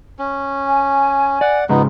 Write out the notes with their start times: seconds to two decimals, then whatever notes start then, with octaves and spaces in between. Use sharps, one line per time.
0.19 C#4
0.67 G#5
1.41 D5 F#5
1.69 G#2 C#3 G#3 B3 D#4 F4